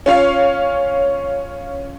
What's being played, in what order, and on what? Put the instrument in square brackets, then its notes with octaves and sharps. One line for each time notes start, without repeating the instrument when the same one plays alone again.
[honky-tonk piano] C#4 F4 C#5 F5